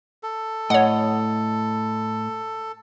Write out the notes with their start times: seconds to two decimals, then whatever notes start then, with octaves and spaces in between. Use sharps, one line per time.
0.23 A4
0.70 A2 C#5 D#5 F#5